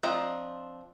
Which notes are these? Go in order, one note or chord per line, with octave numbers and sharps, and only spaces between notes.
F3 C4 D4 D#5 A#5